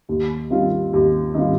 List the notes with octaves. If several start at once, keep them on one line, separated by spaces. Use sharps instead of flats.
D#2
D#3 G3 C4 F4
D#2
D#3 G3 C4 F4